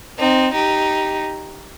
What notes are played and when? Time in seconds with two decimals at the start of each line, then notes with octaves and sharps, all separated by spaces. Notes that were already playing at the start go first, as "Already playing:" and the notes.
0.19 C4 D#4
0.54 D#4 G4